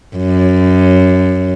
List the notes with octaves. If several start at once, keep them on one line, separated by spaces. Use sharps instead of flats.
F#2